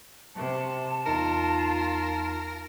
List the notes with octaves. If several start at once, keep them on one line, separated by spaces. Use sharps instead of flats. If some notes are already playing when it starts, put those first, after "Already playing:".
C3 A5
E2 D#4 F4 A#4 C#7